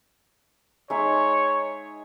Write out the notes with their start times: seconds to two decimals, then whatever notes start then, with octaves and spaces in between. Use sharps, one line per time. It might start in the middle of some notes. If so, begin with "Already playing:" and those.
0.90 G#3 D#4 C#5 E5